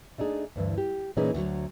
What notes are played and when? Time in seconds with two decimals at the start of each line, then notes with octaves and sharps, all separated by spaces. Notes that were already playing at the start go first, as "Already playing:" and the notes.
0.18 A3 D4 D#4 G#4
0.56 D2 G2 E3
0.78 G4
1.17 A#2 E3 A#3 C#4 D#4 G#4
1.34 D2 F#3